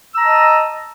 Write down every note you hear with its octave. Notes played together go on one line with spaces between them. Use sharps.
D#5 A5 A#5 E6